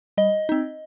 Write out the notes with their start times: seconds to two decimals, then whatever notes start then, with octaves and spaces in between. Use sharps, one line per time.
0.17 G3 D#5
0.49 C4 D#4